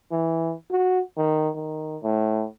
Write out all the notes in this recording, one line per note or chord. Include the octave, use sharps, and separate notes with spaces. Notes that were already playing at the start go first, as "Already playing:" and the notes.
E3
F#4
D#3
D#3
A2